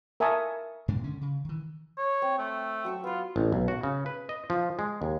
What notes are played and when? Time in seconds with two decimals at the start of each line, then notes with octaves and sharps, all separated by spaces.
0.20 A#4 E5 G#5 A5 C#6 D#6
0.88 G2 B2 G#3 D4
1.04 D3 C#4
1.21 C#3
1.45 D#3 E3
1.97 C#5
2.22 C4
2.38 A3
2.84 F#3 C#6 E6
3.04 B3 F4 B4
3.36 A1
3.52 B1
3.68 F#4
3.83 C#3
4.06 B4
4.29 D#5
4.50 F3
4.79 G#3
5.02 D#2